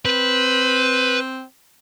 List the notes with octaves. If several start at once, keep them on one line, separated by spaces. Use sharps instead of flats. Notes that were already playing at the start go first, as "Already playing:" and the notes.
C4 B4